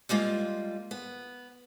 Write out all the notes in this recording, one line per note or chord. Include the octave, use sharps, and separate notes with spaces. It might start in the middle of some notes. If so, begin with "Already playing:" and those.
G3 G#3 A#3 F4
B3